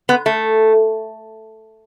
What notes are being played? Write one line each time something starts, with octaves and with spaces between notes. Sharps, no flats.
B3
A3